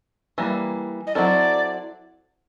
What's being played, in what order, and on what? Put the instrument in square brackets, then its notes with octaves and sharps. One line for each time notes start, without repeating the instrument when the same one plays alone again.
[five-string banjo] E3 G3 A#3
[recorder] D#5
[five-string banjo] F#3 A3 C4 E4 A4 [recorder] D5